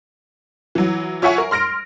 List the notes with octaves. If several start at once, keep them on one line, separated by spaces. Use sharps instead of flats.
E3 F#3
F4 C#5 E5 F#5 G#5 C#6
A#4
C6 F6 A#6 D7